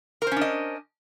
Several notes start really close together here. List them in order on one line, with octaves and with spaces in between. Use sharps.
A#4 C5 C#4 D4 D#5